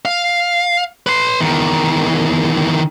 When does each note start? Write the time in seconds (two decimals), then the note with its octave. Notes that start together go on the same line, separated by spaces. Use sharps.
0.05 F5
1.06 B4 C6
1.40 E2 D#3